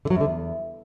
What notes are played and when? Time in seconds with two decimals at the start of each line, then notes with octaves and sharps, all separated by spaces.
0.05 D3
0.10 F#3
0.15 F#2
0.21 D3
0.26 E2